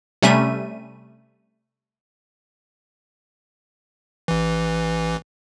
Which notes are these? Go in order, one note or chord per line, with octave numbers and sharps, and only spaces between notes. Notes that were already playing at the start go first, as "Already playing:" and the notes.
C3 G3 A3 C#4 E5 D#7
A1 E3